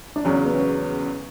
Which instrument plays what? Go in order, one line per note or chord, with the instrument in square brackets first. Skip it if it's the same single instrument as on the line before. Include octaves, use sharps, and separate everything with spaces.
[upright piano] D4
[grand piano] E2 C#3 F#3 [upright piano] C#4
[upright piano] B3
C#4